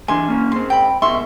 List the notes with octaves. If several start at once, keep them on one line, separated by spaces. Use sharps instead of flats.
C2 E3 D4 G#5 C6
A#3 C#4
G#2 C4 C6
G5 B5
G#2 B2 E5 C6 C#6